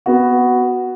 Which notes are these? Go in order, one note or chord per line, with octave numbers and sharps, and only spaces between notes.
B3 F#4